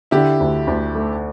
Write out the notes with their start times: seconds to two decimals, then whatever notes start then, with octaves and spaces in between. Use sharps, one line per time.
0.11 D3 E4 G4
0.40 D2
0.67 D2
0.95 A3